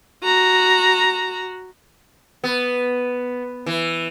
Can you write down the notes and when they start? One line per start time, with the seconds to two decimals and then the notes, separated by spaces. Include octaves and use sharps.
0.23 F#4 A#5
2.44 B3
3.66 E3